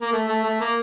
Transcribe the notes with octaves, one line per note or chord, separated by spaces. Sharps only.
A#3
A3
A3
A3
A#3